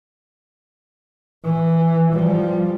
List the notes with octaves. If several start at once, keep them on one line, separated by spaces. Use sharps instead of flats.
E3
F3 G3